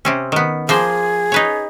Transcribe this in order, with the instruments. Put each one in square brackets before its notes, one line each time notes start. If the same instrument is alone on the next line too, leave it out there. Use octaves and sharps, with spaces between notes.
[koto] C3 C4 C#4
D#3 B3
[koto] F3 A#3 C5 [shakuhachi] G#4
[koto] D#4 B4 C#5